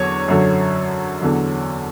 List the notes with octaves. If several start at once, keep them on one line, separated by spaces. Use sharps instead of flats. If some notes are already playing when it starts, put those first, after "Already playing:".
Already playing: E2 D3 F#3 C#5
F#2 D3 F#3
E2 D3 F#3